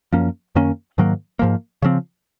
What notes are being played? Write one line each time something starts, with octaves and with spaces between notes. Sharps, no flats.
F#2 F3 A#3 C#4
F#2 D#3 A#3 C#4
G#2 D#3 F#3 A#3
G#2 F3 A#3
C#3 F3 C4